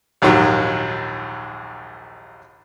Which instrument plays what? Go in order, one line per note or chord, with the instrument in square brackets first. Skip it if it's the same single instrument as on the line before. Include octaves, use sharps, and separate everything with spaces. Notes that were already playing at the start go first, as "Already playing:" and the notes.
[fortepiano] A#1 D#2 G#2 D#3 F#3